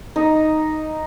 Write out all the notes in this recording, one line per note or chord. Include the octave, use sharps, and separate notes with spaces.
D#4